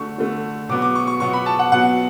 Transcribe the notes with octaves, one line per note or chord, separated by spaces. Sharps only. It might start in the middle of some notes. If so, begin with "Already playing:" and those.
Already playing: D3 A3 C#6
D3 A3
B2 F#3 B3 D6
D6
C#6
C#6
B2 F#3 B3 C#6
B5
A5
F#5
B2 F#3 B3 F#5